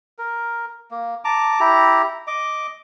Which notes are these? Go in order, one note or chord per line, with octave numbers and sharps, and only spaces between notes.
A#4
A#3
A5 A#5 D6
E4 G4 A#5
D#5 D6